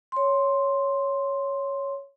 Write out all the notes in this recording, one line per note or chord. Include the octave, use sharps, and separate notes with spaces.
C#5 C6